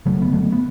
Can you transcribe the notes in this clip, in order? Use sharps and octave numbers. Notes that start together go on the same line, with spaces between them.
F#1 F#2 D3 F#3 A3
B3
F#3 A3
B3